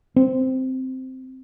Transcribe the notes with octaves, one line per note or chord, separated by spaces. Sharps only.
C4